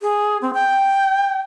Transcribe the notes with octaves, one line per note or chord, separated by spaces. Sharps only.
G#4
C4
G5